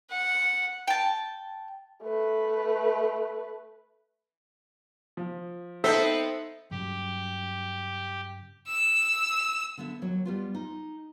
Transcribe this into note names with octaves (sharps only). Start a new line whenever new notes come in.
F#5
G5 A5
A3 B4
F3
B3 C4 D#4 A4 C5 E5
G2 C#3 F#3 G4
E6
D3 B3 E5
D#2 F#3 C#5
G3 B3 F4
D#4